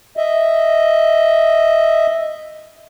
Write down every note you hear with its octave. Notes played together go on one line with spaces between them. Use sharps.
D#5 E5